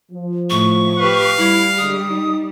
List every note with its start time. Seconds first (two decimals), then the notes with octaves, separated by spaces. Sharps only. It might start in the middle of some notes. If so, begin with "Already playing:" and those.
0.12 F3
0.50 A2 C#6
0.99 G4 B4 F5
1.37 G3 E4
1.78 D3 G#3 G4 D#6
2.09 D#4